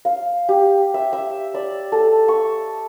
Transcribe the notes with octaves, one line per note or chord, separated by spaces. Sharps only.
F5
G4
E5
E5
D5
A4
C#6